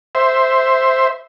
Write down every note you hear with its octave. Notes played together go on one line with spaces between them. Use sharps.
C5 E5